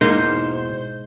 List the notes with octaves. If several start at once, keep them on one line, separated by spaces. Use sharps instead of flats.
G#2 B2 A#3 D#4 E4 F#4 C5